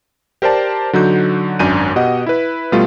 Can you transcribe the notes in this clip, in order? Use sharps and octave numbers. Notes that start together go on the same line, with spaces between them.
G4 A#4 C5 D5 A5
D3 F#3 D#4 F#4 G6
G#1 F#2 D4 G#5 G6 D#7
B2 G4 D#5 F#5
E4 B4
B2 G3 A3 F4